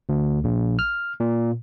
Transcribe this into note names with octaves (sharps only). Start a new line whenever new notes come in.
D2
A#1
F6
A#2